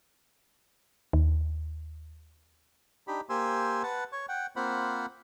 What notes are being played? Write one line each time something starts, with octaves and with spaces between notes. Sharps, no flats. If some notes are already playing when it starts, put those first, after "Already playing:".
D#2
D4 D#4 G4 B5
A#3 G4 C5 G#5 C6 E6
B4 F#5 A5
C#5 C#6
F#5 G5
A#3 C4 F4 C5 F#5 B5